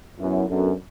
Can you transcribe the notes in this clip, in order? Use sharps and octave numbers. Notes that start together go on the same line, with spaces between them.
F#2 F#3 B3 E4
F#2 F#3 B3 D4 F#4 A4